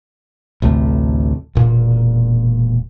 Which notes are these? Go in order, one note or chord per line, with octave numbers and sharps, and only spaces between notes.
A1 D2 C3 A3
E1 A#2